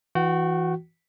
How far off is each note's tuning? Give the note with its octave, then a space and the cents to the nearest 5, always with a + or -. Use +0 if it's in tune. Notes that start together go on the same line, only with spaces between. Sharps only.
E3 +0 F#4 -15 G5 -45